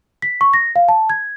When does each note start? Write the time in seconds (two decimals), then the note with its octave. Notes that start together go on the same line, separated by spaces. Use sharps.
0.22 B6
0.41 C#6
0.53 A#6
0.76 F5
0.89 A5
1.10 G#6